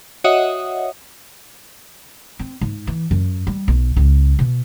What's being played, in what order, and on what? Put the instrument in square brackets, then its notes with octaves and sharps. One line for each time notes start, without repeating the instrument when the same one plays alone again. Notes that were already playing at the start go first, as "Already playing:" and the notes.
[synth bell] F#4 C#5 D#5 E5 F#5 D#6
[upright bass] C4
G#2
E3
F#2
G3
B1
C#2
B2